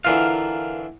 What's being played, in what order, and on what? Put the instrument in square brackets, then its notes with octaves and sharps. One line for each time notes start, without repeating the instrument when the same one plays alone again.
[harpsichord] D3 E3 F4 [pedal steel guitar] A#4 F5